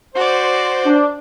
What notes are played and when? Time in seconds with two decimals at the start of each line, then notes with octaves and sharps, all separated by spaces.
0.15 F#4 C5 D5
0.86 D4